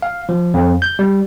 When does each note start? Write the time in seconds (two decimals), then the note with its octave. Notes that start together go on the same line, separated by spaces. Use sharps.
0.02 F5
0.29 F3
0.54 F2
0.82 G6
0.99 G3